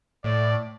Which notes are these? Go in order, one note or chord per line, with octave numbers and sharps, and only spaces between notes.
A2 D5